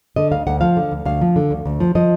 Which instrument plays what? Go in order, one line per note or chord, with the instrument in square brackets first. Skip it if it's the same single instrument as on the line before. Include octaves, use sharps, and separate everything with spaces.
[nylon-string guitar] D3 D#5
D2 F5
D2 F#5
F3 F5
D3
D2
D2 F5
F3
D3
D2
D2
F3
F3 D#5